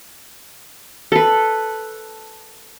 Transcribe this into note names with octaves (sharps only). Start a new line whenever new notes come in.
A4 B4